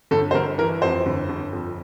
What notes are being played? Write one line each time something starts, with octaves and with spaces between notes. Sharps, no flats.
G1 A4
C5
G1 A#4
E3 A#4
F2 C5
G1
G1
F2